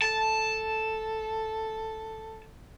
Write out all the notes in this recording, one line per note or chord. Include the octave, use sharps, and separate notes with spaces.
A4 A5